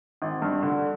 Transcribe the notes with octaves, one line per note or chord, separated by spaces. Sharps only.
G#1
G2
D3